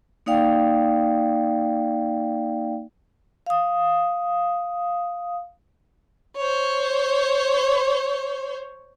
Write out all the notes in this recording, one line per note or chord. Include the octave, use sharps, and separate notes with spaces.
A#3 D#4 D5 F5 G5
F5 D#6
C5 C#5